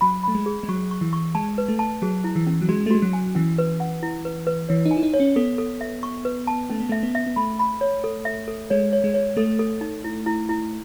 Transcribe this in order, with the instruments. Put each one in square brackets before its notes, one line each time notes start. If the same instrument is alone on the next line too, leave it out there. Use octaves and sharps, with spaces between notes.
[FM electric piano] F#3 [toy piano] B5
[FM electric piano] A3 [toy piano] B5
[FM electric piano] G#3
[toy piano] G#4
[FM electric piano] G#3
[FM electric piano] F#3 [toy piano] C#6
[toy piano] C#6
[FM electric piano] E3
[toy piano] C#6
[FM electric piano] G#3 [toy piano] A5
[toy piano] B4
[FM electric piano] A3
[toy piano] A5
[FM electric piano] F#3 [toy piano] G#4
[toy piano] E4
[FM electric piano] E3
[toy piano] C#4
[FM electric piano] F#3
[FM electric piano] G#3 [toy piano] F#4
[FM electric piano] A3
[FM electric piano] G#3 [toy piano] F#4
[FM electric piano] F#3
[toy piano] G#5
[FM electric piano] E3 [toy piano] C#4
[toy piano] B4
F#5
E4
B4
B4
[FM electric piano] E3 [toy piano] C#5
[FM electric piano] D#4
[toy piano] G#5
[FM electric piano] E4
D#4
[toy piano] C#5
[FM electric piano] C#4
[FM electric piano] B3 [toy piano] A4
[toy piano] A4
E5
C#6
B4
A5
[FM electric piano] A3 [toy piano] C#4
[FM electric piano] B3
[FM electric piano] A3 [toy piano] E5
[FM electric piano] B3
[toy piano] E5
[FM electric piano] B3
[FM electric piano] A3 [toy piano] B5
[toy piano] B5
C#5
A4
E5
A4
[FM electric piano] G#3 [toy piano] C#5
[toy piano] C#5
[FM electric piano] G#3
[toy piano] C#5
[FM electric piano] A3 [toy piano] A4
[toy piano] A4
D#4
E4
E4
E4